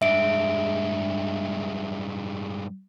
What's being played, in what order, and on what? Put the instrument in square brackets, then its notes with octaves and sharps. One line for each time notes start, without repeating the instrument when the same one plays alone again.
[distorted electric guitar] G2 G#3 [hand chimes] E5 D7